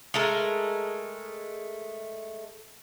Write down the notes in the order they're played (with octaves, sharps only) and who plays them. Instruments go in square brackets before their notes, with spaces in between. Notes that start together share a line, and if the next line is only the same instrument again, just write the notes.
[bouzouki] G#3 A3 A4 A#4